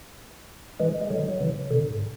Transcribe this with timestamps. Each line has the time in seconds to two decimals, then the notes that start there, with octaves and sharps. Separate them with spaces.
0.80 E3 G#3
1.01 G#3
1.10 D3 F#3
1.29 F#3
1.40 C#3 E3
1.71 B2 D3
1.90 G#2